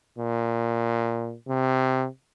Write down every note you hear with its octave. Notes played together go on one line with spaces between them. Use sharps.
A#2
C3